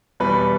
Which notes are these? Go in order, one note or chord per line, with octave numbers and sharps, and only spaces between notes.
E2 B2 G3 B4